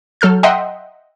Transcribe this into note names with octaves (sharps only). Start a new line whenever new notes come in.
F#3 A4 F6 G6
D#5 E5 F#5 G5 A#5 C6